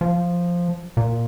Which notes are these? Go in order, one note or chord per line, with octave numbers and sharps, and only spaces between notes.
F3
A#2